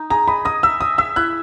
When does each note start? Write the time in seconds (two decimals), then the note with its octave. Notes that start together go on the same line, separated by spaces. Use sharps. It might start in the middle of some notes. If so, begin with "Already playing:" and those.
Already playing: D#4
0.10 G#4 A#5
0.28 D#5 B5
0.45 D#5 D#6
0.63 E5 E6
0.81 E5 D#6
0.98 E5 E6
1.16 E4 F#6